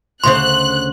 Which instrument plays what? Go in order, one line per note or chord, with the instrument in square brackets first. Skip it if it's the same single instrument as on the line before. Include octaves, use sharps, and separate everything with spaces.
[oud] D2 C#3 C5 [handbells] C6 [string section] F#6